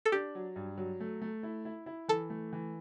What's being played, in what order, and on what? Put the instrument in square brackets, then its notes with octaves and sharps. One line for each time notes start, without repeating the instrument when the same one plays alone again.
[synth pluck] A4
[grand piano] D4 [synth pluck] G4
[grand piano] F#3
G2
F#3
A3
A3
E4
E4
E4
[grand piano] E3 [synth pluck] A4
[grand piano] A3
E3